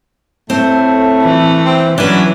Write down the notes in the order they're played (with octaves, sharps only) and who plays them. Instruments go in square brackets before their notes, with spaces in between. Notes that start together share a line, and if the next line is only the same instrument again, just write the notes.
[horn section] A2 [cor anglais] A3 [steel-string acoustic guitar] C4
[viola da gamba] E3
[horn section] C4
[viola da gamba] E3 F#3 [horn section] C#4 F#4 G#5 [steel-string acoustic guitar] D4 B4